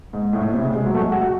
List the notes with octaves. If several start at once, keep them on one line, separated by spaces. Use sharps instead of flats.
G#2
A2
A2
C3
C#3
G#3
F#3
A3
G#3
F#4